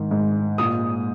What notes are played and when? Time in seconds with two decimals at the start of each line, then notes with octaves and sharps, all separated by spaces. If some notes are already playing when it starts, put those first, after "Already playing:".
Already playing: G#2 D#3
0.11 G#2
0.58 A#2 D#6